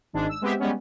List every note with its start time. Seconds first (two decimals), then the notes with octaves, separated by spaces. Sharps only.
0.13 G#1 G#2 G#3 D4
0.29 E6
0.41 G#3 B3 C4 G4 E5
0.59 G3 G#3 B3 C#4